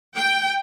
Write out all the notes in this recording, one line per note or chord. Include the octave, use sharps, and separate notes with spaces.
G5